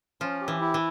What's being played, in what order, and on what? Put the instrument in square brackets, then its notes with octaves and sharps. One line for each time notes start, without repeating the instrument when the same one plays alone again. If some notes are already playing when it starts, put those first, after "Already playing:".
[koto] F3 [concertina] C#4
[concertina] G4
[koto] E3
[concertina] E4
[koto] E3